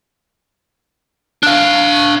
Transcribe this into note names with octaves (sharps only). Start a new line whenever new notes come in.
D4 F5